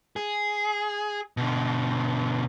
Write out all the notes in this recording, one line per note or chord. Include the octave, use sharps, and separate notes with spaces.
G#4
B2 D3